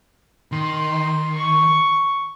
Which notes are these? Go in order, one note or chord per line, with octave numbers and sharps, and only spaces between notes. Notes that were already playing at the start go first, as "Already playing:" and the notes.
D#3 C6
C#6